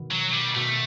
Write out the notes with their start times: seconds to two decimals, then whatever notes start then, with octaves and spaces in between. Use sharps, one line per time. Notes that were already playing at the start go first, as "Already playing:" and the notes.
Already playing: B2 D#3
0.11 F#3
0.33 G3
0.55 B2 A3